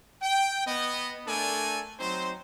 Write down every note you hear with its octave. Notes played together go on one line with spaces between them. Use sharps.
G5
B3 D#5
A3 D4 A4 A#4 D5 G#5
F#3 C4 D#4 C5